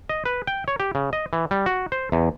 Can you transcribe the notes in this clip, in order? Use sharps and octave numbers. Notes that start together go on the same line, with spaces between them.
D#5
B4
G5
C#5
G4
C#3
D#5
E3
G3
F#4
C5
E2